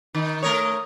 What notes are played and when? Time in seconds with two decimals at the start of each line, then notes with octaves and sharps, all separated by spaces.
0.15 D#3 D#4
0.42 A3 A#4 C#5 D#6